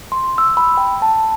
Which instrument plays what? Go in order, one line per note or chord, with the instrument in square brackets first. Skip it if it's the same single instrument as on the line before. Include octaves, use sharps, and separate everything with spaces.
[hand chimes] C6
E6
B5
G5
A5